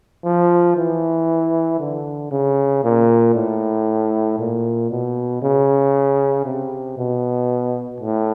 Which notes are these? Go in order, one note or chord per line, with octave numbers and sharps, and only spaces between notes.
F3
E3
D3
C#3
A#2
A2
A#2
B2
C#3
C3
B2
A2